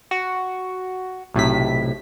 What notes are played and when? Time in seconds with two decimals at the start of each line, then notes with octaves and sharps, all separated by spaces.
0.11 F#4
1.34 B1 A2 C3 B6